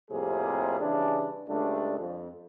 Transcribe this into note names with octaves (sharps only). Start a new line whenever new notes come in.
F2 A2 C3 G3 A#3 G#4
C#3 E3 G3 D4
C#2 G3 A3 D4
F2